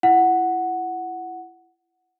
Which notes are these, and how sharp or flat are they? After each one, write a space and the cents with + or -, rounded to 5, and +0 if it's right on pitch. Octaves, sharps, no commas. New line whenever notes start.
E4 +25 F#5 +0